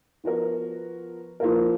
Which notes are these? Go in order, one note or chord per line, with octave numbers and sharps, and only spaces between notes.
F3 B3 F#4 A#4
F3 A#3 F4 A#4